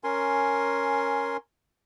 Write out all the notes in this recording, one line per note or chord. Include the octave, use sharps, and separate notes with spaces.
C#4 A#4 G#5 C6